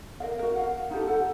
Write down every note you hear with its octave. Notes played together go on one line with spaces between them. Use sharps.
A#4 D#5 F5
F#4 A#4
F5 F#5
D#4 F4 G4 A4
A4 F#5